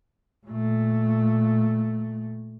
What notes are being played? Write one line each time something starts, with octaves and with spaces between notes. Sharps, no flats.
A#2 A3